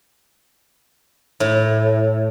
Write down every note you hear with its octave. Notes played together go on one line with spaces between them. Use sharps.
A2